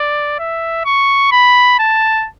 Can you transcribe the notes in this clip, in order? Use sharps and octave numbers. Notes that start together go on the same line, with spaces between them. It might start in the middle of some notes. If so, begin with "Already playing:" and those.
Already playing: D5
E5
C#6
B5
A5